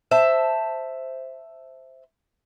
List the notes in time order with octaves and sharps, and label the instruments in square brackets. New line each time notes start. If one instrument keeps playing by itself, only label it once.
[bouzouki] C5 E5 A5